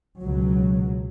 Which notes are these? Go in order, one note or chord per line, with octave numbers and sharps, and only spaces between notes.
C#2 B2 F#3